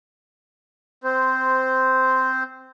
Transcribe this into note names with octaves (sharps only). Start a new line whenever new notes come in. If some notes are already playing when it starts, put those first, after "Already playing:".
C4 C5